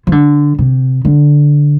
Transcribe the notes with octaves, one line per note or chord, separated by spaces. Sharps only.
F3
D3
C3
D3